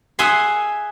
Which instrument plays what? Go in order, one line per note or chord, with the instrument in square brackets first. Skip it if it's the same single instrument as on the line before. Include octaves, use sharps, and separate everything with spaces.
[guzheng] G#4 E5 F#5 G#5 C6